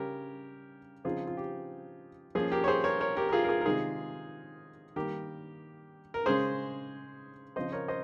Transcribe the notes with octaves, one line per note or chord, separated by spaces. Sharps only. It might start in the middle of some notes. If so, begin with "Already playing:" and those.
Already playing: C#3 G3 C#4 G4 A#4
C#3 F3 C4 D#4 F4 G#4
F4
G4
F3 A#3 C#4 F4 G#4
G4 A#4
C#5
G#4 C5
A#4 C#5
A#4 C#5
G4 A#4
A#4
F4 G#4
A#4
F4 G#4
A#4
C3 D#3 G#3 D#4 F4 G#4
D#3 G3 A#3 G4 A#4
A#4
C#3 G#3 C#4 G#4 C5
C#3 F3 C4 C5 D#5
A#4 C#5
C5 D#5